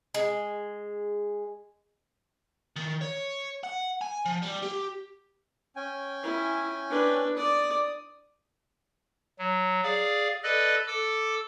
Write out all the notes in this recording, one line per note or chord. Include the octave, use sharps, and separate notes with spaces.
G#3
D#3
C#5
F#5
G#5
F3
G3
G4
C#4 G5 G#5
E4
D4 B4
D5 D#6
F#3
G#4 D5 F5
A4 B4 D5 D#5
A4 D6 E6